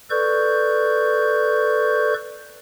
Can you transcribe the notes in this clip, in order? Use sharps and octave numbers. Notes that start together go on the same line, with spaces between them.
A4 B4 D5 C#6 G6